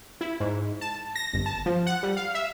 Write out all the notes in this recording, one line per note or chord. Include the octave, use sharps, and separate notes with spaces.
E4
G#2
A5
A#6
G1
A5
F3
F#5
G3
F5
E5